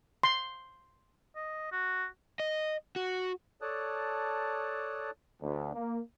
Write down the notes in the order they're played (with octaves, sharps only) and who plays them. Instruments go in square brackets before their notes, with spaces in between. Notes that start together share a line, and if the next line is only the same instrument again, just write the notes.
[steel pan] C6
[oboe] D#5
F#4
[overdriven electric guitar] D#5
F#4
[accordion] A4 C#5 D5 A5 D#6 F#6
[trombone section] D2
A#3